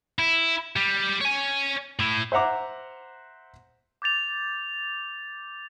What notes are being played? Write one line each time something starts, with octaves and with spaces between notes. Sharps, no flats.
E4
G3
C#5 G#5
A2 E4
C5 E5 F#5 A#5 D6
D6 G6 A6 F7